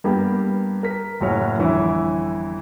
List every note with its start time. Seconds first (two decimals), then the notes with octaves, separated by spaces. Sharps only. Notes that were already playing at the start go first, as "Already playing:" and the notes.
0.04 G2 A#3 B3 G4 A#4
0.83 A#4 B6
1.20 F#1 A2 F#3 C#5 F6
1.58 G1 F2 D3 E3 E4 C#5